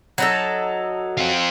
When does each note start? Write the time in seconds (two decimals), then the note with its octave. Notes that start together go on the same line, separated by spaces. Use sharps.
0.18 F#3 D#4 A4
1.17 C4 F4